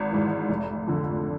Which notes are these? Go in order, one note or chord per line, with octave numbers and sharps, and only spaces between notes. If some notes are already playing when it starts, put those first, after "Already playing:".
Already playing: G#1
G#2 E3
F1
F2 D3